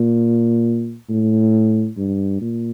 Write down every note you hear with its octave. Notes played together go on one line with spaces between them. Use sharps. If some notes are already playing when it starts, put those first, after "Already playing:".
Already playing: A#2
A2
G2
A#2